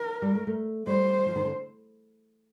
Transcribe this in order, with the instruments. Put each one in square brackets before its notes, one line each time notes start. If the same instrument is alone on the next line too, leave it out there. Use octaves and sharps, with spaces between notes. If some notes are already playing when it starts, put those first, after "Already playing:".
Already playing: [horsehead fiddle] A#4
[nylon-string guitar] G3
A3
A3
[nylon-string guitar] G3 [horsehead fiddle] C5
[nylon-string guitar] F3
D#3
D3